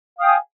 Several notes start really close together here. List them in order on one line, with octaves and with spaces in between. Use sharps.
F5 D#6 G5 G#5